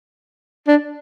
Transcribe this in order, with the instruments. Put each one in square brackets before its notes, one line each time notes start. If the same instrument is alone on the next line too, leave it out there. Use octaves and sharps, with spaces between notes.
[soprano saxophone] D4